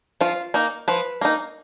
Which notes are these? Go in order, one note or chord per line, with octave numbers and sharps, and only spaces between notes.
F3 F4
A#3 D#4
F3 B4
A#3 D#4